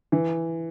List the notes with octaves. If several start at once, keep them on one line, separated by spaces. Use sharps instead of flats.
E3